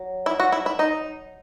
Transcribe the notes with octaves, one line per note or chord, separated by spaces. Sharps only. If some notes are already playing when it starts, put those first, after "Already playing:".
Already playing: F#3
E4
F#4
E4
E4
D#4